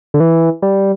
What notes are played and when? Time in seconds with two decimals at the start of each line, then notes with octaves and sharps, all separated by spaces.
0.14 D3
0.20 E3
0.62 G3